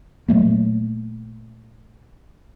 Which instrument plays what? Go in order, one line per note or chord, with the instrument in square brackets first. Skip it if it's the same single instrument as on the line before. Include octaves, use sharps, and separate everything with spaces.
[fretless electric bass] A#2 F#3 A3 A#3